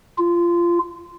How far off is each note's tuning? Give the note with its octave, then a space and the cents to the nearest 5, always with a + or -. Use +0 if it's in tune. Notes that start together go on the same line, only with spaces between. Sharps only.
F4 -20